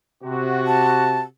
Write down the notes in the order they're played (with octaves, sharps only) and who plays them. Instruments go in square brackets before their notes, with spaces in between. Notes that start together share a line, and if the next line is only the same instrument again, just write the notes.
[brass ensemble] C3 F#4
[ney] A5